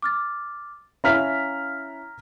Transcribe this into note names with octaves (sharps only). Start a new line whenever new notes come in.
D6 F6 A6
C#4 E4 F5 A#5 F6 B6